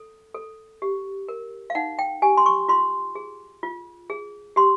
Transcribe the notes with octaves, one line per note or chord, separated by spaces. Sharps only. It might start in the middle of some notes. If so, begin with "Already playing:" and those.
Already playing: A4
A4
G4
A#4
F5
D#4 F#5
G5
G4 G#5
C6
C#6
F4 C6
G#4
F4
G#4
G4 C6